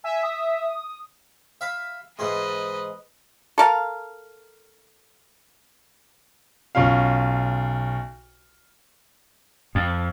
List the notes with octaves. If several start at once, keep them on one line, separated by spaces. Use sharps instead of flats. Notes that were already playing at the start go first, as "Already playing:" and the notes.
E5 G#5
D#6
E5 F5 B5
G#2 E3 G#3 B4 D#5
A4 A#4 F5
B1 C#4 F4 F5
F2